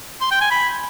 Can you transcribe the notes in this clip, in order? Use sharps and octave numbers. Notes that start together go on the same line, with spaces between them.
C6
G5
G#5
B5